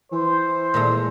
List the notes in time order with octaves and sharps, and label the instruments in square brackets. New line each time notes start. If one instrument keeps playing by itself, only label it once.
[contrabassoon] E3 [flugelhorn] C5
[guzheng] A#2 G#3 A3